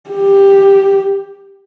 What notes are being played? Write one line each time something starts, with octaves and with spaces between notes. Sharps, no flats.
G4